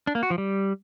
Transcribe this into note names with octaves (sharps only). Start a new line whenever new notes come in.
D4
A#3
F#4
F3
G3